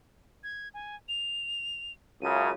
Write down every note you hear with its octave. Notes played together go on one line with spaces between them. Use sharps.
G#6
G#5
F7
C#2 F#2 C#3 D#7